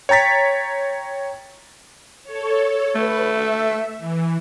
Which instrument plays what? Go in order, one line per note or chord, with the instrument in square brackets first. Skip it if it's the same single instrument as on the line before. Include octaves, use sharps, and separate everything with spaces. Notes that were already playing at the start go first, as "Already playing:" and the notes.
[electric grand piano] C#5 G5 A#5 A6 B6
[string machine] A4 C#5
[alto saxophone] A3 [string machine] B4
[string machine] E5
E3